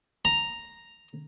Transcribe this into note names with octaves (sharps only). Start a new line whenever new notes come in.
A#5